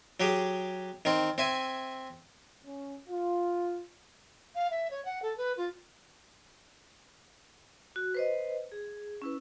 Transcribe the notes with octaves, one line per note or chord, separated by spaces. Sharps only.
F#3 G4 G#4
D#3 C4
C4 E5 G#5
C#4
F4
F5
E5
C#5
F#5
A4
B4
F4
F#4
B4 C5 D#5
G#4
C#4 E4 B4